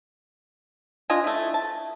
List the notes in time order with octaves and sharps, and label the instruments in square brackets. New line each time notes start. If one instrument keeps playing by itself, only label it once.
[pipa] D4 F4 D#5 G#5
A3 E4
A5